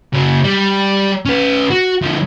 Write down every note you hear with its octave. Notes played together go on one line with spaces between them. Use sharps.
C#3 F#4
G3
C#4 B4
F#4
D3 F3